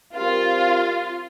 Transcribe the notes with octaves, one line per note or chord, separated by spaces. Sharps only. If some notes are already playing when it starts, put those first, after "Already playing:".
G3 C4 F4 G4 A#4